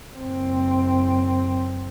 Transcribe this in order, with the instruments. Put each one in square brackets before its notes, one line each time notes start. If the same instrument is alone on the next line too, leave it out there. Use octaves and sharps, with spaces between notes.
[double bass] F#1 C4